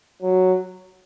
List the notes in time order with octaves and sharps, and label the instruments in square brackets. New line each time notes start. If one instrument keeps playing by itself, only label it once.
[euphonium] F#3